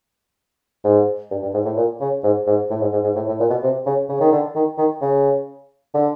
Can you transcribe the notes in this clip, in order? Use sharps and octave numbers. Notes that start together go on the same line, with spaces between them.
G#2
G2
G2
G#2
A2
A#2
C#3
G#2
G#2
A2
G#2
G#2
G#2
A2
A2
A#2
B2
C3
C#3
C#3
D#3
D3
D#3
D#3
C#3
D3